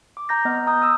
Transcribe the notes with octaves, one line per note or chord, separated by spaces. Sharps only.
D6
A#5 G6 A#6
B3 D#5 F6
A#5 D#6 G6
D#6 E6